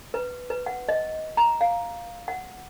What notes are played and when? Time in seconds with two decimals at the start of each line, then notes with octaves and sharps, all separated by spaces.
0.14 B4
0.50 B4
0.66 F#5
0.89 D#5
1.37 A#5
1.61 F5
2.28 F#5